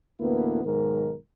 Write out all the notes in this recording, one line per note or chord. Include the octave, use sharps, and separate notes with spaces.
A1 D2 A#3 B3 E4 B4
B1 G#2 D#3 A#4